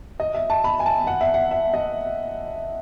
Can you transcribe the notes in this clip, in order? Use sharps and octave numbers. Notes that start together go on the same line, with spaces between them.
D#5
E5
A5
B5
G#5
A5
F#5
E5
F#5
E5
D#5